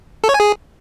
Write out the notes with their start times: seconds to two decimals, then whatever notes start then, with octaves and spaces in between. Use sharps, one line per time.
0.24 A4
0.29 C#5
0.34 G#5
0.40 G#4